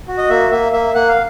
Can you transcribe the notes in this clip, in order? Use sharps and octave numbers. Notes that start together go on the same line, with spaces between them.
F#4
D#5
A#3 E5
A#3 E5
A#3 E5
A#3 F#5
F5